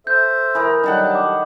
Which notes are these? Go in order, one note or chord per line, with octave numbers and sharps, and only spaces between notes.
A4 C5 E5 G6
E3 A#4 B5 D#6
D#3 F#3 G3 D4 A4 F#5
D6